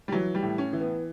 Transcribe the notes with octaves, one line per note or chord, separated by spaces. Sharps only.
G3
E3 F#3
G3
A2
C#4
E3
B3